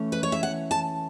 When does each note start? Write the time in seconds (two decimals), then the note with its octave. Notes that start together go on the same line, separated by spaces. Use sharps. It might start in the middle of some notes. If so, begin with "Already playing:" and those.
Already playing: E3 A3 C#4
0.12 B4
0.23 C#5
0.32 E5
0.43 F#5
0.71 A5